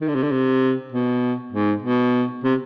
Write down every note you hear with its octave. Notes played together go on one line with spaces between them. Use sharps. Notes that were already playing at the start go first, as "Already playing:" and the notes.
D#3
D3
C3
D3
C3
B2
G#2
B2
C3